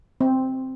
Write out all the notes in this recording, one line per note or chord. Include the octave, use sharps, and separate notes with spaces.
C4